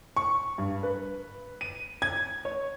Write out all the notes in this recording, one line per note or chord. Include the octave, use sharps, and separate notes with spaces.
C#6
G2
B4
D#7
G#6
C#5